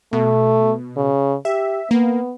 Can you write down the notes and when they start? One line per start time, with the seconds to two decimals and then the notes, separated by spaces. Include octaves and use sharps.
0.13 B2 A3
0.97 C#3
1.45 G4 E5
1.91 A#3 B3